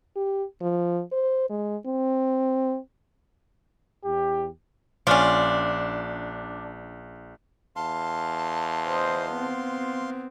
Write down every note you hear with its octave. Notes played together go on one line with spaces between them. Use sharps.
G4
F3
C5
G#3
C4
E2 G4
A#1 C#4 D4 F4
E2 F5 A5 C6
C5 D#5
B3 C4